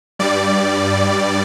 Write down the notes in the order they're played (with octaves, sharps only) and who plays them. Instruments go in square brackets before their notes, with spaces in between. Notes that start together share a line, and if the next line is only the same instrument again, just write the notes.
[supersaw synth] G2 G3 D5